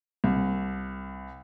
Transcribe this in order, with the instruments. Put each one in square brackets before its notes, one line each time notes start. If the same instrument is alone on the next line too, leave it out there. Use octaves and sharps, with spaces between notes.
[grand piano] C2